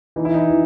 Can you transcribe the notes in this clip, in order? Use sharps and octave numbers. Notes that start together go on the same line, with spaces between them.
E3 D#4
E4
D#4
E3